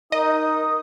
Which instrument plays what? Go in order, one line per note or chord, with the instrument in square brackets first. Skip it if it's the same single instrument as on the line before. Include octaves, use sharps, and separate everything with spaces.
[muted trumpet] D#4 [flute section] A#4 D#6 [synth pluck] D#5